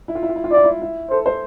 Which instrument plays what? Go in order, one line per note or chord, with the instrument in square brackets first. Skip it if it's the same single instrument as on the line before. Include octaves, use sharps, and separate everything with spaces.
[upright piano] E4
F4
E4
F4
E4
F4
[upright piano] E4 [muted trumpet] D5
[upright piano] F4
E4
E4
[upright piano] A4 [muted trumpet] C5
[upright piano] C5